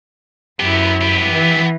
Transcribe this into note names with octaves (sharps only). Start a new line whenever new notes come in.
F#2 B3 E4 G4
B3 G4
E3